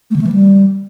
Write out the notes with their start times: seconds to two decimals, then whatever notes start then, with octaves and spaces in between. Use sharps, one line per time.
0.11 A3
0.16 D3
0.21 A3
0.27 E3
0.32 G3